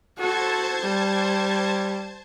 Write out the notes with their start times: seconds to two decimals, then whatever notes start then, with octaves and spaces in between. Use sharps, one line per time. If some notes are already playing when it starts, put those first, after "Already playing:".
0.18 F#4 A4 C5 A5 G#6
0.81 G3